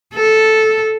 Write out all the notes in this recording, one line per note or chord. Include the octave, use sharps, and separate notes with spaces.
A4